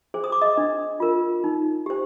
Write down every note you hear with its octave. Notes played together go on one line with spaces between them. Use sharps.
G#4 C5
D#6
D6
D#5 D#6
D4
F4 A#4
D#4
G4 C5